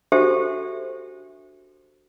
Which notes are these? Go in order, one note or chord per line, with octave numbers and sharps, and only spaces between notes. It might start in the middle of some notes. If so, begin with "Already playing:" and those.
D4 F#4 G4 A4 C5 E5